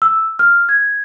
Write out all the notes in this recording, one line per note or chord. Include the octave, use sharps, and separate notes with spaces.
E6
F6
G#6